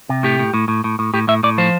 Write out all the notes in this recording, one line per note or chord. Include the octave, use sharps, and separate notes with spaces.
C3
A2 G4
A2
A2
A2
A2
A2
A2 G4
A2 E5
A2 D5
F3 C5